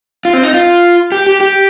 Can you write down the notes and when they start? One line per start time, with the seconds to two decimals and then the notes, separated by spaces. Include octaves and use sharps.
0.25 F4
0.33 C4
0.43 D#4
0.54 F4
1.12 G4
1.27 G4
1.41 G4